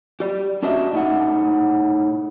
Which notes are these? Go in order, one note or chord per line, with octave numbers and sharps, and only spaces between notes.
G4 D5
C#4 D4 F#4 D#5 E5 A5
A2 D#4 F#5